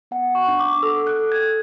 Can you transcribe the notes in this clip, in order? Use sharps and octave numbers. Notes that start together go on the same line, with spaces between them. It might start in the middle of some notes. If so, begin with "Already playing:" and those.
B3 F#5
C#6
D4
D6
A4 E6
F#6
A4
G#6